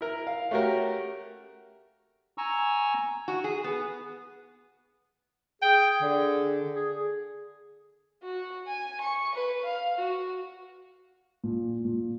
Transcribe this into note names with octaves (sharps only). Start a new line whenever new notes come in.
E4 A#4
F5
A3 C#4 F#4 G4 A#4
G#5 A#5 C#6 E6
F#4
G#4
B3
G#4 G5
D3
G#4
F#4
G#5
C#6
B4
F5
F#4
A#2
A#2